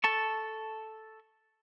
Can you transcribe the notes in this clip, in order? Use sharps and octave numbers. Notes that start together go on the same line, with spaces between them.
A4 A5 C#6